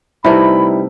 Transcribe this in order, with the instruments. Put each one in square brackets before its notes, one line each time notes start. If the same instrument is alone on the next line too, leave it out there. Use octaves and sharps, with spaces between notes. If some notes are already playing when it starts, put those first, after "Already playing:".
[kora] C3 A3 A#4 [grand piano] G3 D#4 B4 [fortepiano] E4 [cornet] B5